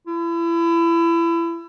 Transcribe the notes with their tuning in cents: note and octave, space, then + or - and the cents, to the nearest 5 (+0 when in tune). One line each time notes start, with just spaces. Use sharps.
E4 +30